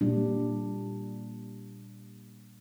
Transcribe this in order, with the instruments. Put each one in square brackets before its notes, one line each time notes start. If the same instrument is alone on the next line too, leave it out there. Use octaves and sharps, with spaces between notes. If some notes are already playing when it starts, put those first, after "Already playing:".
[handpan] A#2 G3 D4